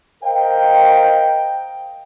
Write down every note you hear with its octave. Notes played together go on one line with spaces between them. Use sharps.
A#4 C5 D#5 F5 G5